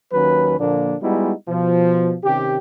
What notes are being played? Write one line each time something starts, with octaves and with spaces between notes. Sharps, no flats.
D#2 D#3 F#3 C#4 B4
A#2 D3 F3 A#3 D4
G3 G#3 B3 D#4 E4 F#4
B2 F3
C3 D#3 C#4 G4